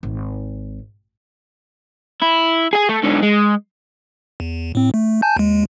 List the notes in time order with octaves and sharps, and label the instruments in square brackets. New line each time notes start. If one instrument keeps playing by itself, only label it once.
[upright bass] G#1
[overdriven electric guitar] E4
G#4 G#5
A3
G#2 D3
G#3
[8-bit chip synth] E2
A2 C4
A3
G#5 A5 G6
D#2 G#3